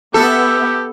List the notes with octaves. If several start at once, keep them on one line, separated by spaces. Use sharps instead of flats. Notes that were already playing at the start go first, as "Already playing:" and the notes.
B3 G4 A4 E5 F#5